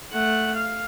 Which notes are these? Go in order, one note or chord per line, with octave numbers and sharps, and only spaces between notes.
A3 F#5
F5